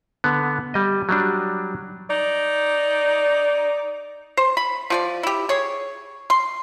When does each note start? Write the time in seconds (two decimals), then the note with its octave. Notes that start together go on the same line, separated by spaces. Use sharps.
0.24 D3 B3
0.74 G3 D#5
1.09 F#3 G3 D4
2.10 D#4 D5
4.37 C5
4.57 B5
4.90 F3 G4 D5
5.23 E4 G4
5.49 G#4 C#5
6.30 C6